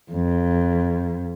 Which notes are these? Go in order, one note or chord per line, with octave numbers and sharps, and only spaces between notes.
F2